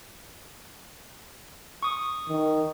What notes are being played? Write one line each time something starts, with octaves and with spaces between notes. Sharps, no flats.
C#6 D#6
D#3